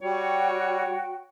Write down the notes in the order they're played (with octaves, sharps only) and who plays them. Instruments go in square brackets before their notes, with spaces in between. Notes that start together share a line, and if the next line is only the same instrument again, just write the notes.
[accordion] G3 [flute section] F#4 G5 [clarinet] C#5